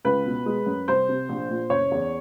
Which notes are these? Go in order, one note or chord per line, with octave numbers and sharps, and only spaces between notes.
C#2 B4
B2
G#3
F#2
C2 C5
C3
A#1
A#2
F#1 C#5
E2